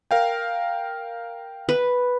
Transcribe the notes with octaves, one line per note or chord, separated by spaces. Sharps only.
A#4 F5 G5
B4